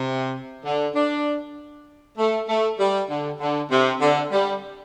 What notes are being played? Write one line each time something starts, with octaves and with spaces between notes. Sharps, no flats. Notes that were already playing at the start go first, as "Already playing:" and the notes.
Already playing: C3
D3
D4
A3
A3
G3
D3
D3
C3
D3
G3